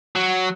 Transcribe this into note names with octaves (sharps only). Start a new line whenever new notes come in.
F#3